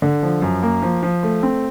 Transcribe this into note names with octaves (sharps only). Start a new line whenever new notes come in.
D3
F3
F#2
A#3
F3
F3
A3
C4